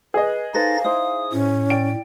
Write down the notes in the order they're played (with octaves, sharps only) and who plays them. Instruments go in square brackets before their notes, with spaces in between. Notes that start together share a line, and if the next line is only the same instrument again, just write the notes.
[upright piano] G#4 D#5 [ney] B4
[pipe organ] D#4 A6 A#6 [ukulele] A4 B4 C5 [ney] F5
[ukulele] D#4 E4 C5 [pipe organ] D#6
[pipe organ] A2 [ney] C#4
[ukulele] D5 G5 [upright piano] D7